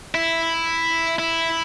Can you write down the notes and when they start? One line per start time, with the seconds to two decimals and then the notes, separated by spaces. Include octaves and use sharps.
0.15 E4
1.19 E4